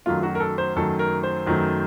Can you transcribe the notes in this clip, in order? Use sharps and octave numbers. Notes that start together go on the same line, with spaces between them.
F#2 D#3 F#3 A3 F4
F#4
A#4
A4
C5
F#2 D#3 F#3 A3 A4
A#4
C5
F#2 D#3 F#3 A3